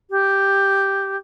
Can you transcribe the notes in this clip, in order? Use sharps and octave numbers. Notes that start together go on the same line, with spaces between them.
G4